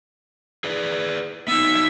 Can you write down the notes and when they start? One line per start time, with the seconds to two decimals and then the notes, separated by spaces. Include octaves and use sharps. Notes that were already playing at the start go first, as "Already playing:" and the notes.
0.64 G#4 B4 D5
1.48 B3 D#4 E5